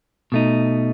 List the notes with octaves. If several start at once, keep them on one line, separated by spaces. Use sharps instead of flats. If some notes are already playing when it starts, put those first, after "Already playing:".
B2 A3 D#4